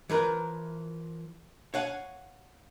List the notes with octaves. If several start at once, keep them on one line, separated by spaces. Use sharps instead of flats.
E3 F3 A#4 B4
C#5 F5 F#5 G#5